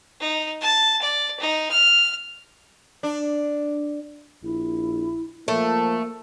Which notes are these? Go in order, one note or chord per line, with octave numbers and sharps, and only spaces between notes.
D#4
A5
D5
D#4
F6
D4
A#1 E4
F3 A3 A#3